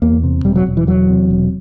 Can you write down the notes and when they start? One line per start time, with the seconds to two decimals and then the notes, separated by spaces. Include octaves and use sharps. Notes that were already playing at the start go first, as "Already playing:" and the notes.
0.02 E2 A#3
0.23 C3
0.45 E1 G3
0.56 F#3
0.66 E1
0.77 E3
0.87 E2 F#3
1.09 C3
1.30 E1